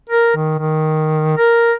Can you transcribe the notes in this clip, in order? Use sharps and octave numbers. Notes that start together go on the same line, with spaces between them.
A#4
D#3
D#3
A#4